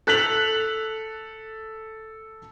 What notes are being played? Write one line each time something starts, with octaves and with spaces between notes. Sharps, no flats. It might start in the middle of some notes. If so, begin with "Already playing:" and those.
A4 F#6 B6 F7 F#7